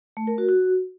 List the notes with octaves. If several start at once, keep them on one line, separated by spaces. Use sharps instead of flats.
A3
A#4
F#4
F#4